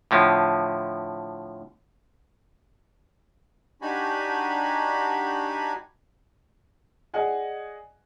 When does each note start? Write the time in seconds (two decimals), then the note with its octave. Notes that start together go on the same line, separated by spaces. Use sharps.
0.11 A2 D3 F3
3.82 D4 D#4 F#4 G4 G#5 B5
7.14 G#4 D5 D#5 F#5 G#5